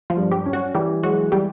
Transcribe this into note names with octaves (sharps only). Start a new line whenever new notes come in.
F3 F4
G2
G3 G4
C#4
F#3 F#4
E3 G3 G4
F#3 G#3 F#4
G3 G4